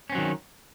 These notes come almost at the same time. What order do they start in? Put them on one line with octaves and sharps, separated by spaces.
C#4 C4 F#3 D#3